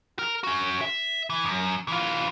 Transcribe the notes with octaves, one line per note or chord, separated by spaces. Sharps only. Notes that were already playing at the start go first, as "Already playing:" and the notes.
A#4
C#4 F#4
E5
E3
F#2
E3 F4